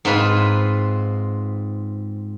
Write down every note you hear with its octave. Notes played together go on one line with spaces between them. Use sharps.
G#2 C4 F4 B4 G#5